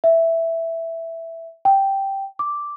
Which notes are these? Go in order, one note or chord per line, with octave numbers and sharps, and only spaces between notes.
E5
G5
D6